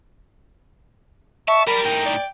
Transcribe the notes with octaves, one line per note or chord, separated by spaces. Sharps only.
E5 A5 C#6
G3 A#4 D5 B5
A2 D#4 G5
D5